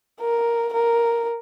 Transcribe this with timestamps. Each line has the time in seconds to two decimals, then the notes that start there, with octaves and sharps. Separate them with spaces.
0.21 A#4
0.73 A#4